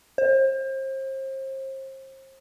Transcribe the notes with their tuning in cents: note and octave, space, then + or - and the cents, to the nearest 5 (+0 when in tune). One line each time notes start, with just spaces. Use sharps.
C5 +35